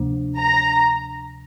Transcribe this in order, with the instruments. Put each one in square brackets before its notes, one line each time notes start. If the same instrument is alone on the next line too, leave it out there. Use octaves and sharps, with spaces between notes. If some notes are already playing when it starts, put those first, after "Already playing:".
Already playing: [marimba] D2 C3 F3 A#3 D4
[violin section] A#5